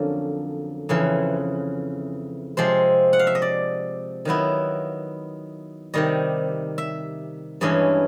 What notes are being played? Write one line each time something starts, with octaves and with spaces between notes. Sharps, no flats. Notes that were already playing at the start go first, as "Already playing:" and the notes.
Already playing: F2 D3 F#3 A#3 C#4
F2 C#3 E3
C3 F3 G#3 C4 C5
F#5
F5
E5
D#5
D5
D#3 F#3 B3 E4
C3 D#3 G3 D#5
E5
G2 E3 G#3 C#4 D#5